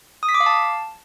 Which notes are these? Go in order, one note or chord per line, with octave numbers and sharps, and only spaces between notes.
D#6
B6
D6
F5
A5